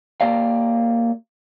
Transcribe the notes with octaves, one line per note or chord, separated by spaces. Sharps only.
A#3 G4 D5 F5